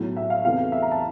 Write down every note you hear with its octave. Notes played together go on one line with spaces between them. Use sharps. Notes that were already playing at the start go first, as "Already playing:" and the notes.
Already playing: B1 A2 F#3
E5
F5
E2 C3 E3 A3 F5
E5
A#5
A5